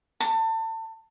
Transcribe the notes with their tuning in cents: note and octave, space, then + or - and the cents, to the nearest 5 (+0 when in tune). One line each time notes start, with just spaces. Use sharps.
A5 +30